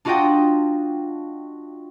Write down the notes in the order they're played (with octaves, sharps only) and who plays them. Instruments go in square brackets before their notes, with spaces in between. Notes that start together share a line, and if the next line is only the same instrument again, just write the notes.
[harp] D4 F4 F#4 D#5 F#5 G5